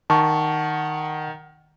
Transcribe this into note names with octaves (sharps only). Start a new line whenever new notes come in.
D#3 F#5 A5 C#6